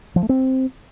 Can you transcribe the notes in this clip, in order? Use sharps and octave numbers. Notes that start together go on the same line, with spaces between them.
F3
A3
C4